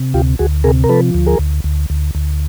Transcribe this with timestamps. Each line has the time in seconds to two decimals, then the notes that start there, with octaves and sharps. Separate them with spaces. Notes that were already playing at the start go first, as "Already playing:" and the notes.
Already playing: C3
0.14 D2 F4 G4
0.39 D2 F#4 G#4
0.64 C3 G#4 A#4
0.84 A#4
0.89 F3 A4 B4
1.14 D2
1.26 G#4 A#4
1.39 D2
1.64 D2
1.90 D2
2.15 D2